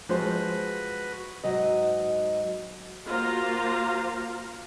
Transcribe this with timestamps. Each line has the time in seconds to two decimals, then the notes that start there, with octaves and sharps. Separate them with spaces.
0.09 F3 G#3 F#4 B4 C5
1.44 G#2 F#3 D#5
3.07 A#3 F4 F#4 C5 F5 A#5